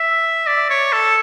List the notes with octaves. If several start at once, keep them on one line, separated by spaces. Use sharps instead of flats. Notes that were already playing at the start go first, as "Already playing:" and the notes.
Already playing: E5
D5
C#5
A4